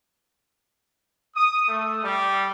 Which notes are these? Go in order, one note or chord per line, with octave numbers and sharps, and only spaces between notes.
D#6
A3
G3